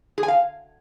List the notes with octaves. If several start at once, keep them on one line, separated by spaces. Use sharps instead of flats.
G#4
G#5
F5